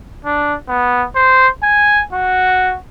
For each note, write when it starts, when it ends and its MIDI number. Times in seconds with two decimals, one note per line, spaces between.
0.25 0.54 62
0.69 1.05 59
1.16 1.48 72
1.63 2.03 80
2.13 2.77 66